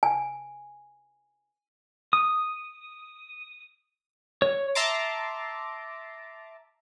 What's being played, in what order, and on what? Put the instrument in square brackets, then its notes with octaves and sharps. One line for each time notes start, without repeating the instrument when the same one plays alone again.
[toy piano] G#5
[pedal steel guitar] D#6
C#5
[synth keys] E5 A5 A#5 C6 D6